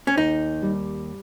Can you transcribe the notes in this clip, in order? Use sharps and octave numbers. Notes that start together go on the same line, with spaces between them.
C#4
D#2 D#4
G3